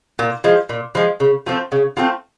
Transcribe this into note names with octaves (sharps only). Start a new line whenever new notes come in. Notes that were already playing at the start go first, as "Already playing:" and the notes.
A#2
F3 G#3
A#2
F3 G#3
C#3
F3 A3 C4
C#3
F3 A3 C4